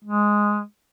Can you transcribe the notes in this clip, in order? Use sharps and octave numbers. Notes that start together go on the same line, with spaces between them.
G#3